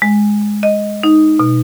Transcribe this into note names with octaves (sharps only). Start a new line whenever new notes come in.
G#3
D#5
D#4
B2